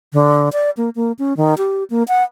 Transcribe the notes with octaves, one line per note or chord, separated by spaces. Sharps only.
D3
D5
A#3
A#3
C#4
D#3
G4
A#3
F#5